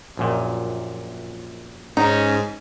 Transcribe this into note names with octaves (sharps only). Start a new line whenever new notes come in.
A#1 F#2 A#2
G#2 C#4 D#4